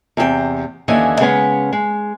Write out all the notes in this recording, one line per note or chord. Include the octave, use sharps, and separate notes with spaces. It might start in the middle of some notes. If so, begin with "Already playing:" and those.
E2 C3 G#4 G5
D#2 D3 E3 C#4 D#5 G#5
C#3 G#3 B3 C#4 G#5
G#3